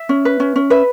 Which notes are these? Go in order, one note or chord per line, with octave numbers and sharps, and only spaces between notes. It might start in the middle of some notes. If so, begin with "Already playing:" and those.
Already playing: E5
C#4
B4
C#4
C#4
B4 E5